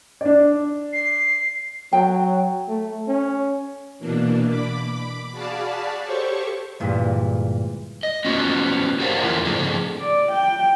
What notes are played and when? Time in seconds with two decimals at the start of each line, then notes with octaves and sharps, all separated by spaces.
0.21 D4 D5
0.93 C7
1.93 F#3 G5
2.68 A3
3.08 C#4
3.99 B2 E3 A#3 D4
4.49 B5 D6
5.32 F#4 G#4 D5 F5 A5 B5
6.06 G4 A4 C5 C#5 C#6
6.80 D2 G2 A#2 E3 G#3
8.03 D#5
8.25 B3 C#4 F4 F#4
9.00 G4 A#4 C5 C#5 F5 F#5
9.20 E2 D3 E4 F4 A#4 E5
9.45 A2 C#3 F3 C4 G#4 A4
9.99 D5
10.32 G5